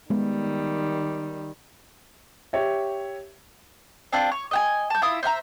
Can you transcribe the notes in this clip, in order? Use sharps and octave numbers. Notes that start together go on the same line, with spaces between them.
D#3 G3 G#3 B3
G4 C#5 E5
C4 D4 F4
C#5
D#5 G5 G#5
A5 G6
E4 F4 E5 D#6
C5 E5 F5 A#5